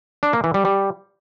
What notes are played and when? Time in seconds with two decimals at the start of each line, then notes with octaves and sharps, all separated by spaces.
0.23 D4
0.33 A#3
0.44 E3
0.54 G3
0.65 G3